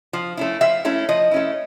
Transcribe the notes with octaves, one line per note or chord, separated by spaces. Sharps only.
F3
A3 C#4 E4
F3 E5
A3 C#4 E4
F3 D#5
A3 C#4 E4